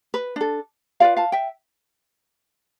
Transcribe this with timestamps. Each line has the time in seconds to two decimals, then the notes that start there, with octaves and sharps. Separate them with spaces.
0.14 B4
0.36 D4 A4
1.00 F4 B4 D5 F5
1.17 F5 A5
1.32 E5 G5